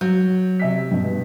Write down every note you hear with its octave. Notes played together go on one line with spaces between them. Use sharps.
F#3 G6
C3 E5 B6
G2 B2